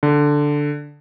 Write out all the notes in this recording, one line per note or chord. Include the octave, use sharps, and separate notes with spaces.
D3